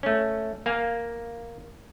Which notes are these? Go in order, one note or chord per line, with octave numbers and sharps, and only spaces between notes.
A3 C#4
A#3 F5 G#5